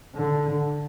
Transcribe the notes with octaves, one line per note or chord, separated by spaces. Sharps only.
D3